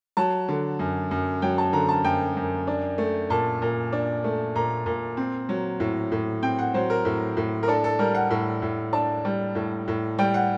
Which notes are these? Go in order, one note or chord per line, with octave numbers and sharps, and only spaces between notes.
F#3 A5
D3
F#2
F#2
F#3 G5
A5
D3 A#5
A5
F#2 G5
F#2
D4
A3
A#2 A5
A#2
D4
A3
A#2 A#5
A#2
C4
F#3
A2
A2
C4 G5
F#5
F#3 C5
A#4
A2
A2
A#4
D4 A4
A4
G3 A#4
F#5
A2
A2
D4 A5
G3
A2
A2
G3 G5
F#5